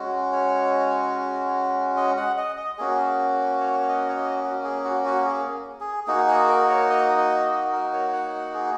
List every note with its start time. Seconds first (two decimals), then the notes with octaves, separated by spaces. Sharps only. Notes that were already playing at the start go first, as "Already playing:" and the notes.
Already playing: G#3 C#4 F#4
0.32 C#5
1.97 D#5
2.17 F#5
2.38 D#5
2.57 D#5
2.78 A#3 C#4 F#4 G#4
3.61 C#5
3.89 D#5
4.09 C#5
4.16 D#5
4.44 F#4
4.64 G#4
4.84 F#4
5.05 F#4
5.25 G#4
5.80 G#4
6.07 A#3 D#4 F#4 G#4
6.28 G#4
6.49 A#4
6.70 C#5
6.90 D#5
7.18 D#5
7.45 D#5
7.72 A#4
7.93 C#5
8.13 F#5
8.35 F#5
8.54 G#4